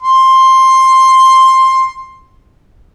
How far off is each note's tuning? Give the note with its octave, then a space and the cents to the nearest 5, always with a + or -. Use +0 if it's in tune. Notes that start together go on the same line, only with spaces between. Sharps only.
C6 +10